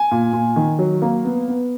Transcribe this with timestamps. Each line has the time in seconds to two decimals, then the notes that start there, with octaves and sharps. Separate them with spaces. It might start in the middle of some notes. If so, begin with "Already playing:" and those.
Already playing: G#5
0.11 A#2
0.33 A#2
0.56 D#3
0.79 F#3
1.02 A#3
1.25 B3
1.48 B3